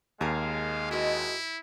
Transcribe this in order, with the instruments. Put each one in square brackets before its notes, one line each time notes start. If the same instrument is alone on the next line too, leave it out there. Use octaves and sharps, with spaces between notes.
[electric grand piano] D#2 [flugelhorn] G#3 [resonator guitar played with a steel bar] G#4 A#4 [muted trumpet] F5
[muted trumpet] E4 [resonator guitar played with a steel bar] F#4 A#4 D#5